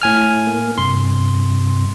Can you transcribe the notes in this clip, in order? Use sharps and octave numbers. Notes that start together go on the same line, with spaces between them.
A2 G#5 F6
A#3
G2 C3 C6